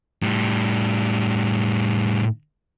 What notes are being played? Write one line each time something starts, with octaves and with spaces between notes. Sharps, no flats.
A2 G3